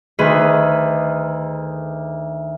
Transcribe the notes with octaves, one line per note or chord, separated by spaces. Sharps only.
D2 D#3 G#4 B4